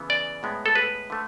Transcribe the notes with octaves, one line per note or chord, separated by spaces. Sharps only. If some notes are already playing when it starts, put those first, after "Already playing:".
Already playing: C#3 E3 B3
D5
A2 G#3 B3
A4
B4
D3 A3